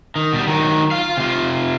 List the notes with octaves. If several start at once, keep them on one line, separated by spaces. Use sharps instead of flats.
D#3
B2 G3
D#3 F#3
F4 F5
C3 F4